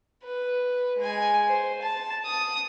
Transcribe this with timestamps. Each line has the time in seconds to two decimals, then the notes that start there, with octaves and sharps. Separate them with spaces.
0.24 B4
0.98 G#3 G#5
1.49 C5
1.82 A5
2.25 D#6